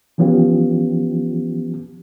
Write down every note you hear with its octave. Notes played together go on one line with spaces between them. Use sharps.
E3 F3 B3 C#4 F4 G4